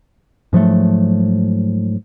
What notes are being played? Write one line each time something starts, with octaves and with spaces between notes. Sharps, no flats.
G#2 F3 F#3 A3